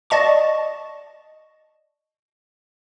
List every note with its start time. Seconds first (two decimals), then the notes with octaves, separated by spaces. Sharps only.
0.10 D5 D#5 A5 C#6